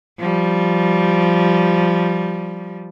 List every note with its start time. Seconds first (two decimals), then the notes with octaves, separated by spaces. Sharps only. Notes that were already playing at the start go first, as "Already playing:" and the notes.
0.19 F3 G3